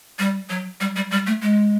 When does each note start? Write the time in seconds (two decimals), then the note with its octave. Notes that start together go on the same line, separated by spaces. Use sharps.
0.19 G3
0.50 F#3
0.81 G3
0.96 G3
1.11 G3
1.27 A3
1.42 G#3